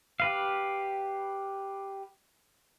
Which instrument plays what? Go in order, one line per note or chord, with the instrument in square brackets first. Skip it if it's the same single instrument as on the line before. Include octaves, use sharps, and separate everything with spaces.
[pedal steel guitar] G4 B4 F5